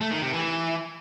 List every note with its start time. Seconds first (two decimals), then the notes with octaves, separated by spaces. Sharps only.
0.01 A3
0.11 D#3
0.22 C3
0.33 E3